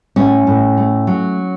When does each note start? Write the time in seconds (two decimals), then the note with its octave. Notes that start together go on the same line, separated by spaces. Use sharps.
0.16 A2 C#4
0.47 A2
0.77 A3
1.07 F#3